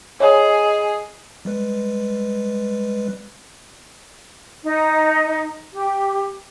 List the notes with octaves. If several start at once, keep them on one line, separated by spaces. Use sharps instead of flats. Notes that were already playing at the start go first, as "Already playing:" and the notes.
G#4 C#5 D#5 G#5 B5
G3 G#3 B4
D#4
G4